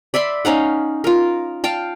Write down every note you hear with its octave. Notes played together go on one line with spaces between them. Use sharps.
D5 E5 B5 C6
C#4 D#4 F5 F#5
F4 A#4
F5 G5 A5